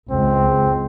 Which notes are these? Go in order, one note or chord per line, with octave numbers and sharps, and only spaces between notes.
C#2 C4